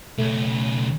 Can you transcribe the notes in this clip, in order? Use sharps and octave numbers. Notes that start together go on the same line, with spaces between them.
B1 C#3 A3